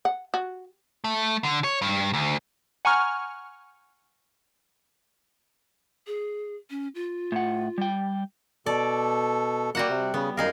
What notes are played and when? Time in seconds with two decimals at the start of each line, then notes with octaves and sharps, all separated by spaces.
0.05 F#5
0.34 F#4
1.04 A3
1.44 D3
1.64 C#5
1.82 G2
2.14 D2
2.85 F#5 G#5 A#5 C#6 F6
6.07 G#4
6.70 C#4
6.95 F4
7.32 A2 F#5
7.78 G3 G5
8.66 B2 A4 D5
9.75 G3 A#3 F#4 F#5
9.90 C3
10.14 C#3 B3
10.37 F#2 D#4 G#4 A#4 F5